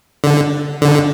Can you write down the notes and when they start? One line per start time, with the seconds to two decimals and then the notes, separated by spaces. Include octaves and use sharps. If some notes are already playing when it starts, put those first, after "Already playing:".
0.24 D3
0.82 D3